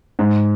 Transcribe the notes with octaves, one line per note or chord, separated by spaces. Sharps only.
G#2